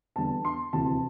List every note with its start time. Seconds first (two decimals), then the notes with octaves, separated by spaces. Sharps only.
0.16 E2 D3 G3 A5
0.45 C6
0.73 D2 C3 E3 A5